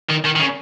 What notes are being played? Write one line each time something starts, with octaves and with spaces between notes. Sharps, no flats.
D#3
D#3
D#3
C#3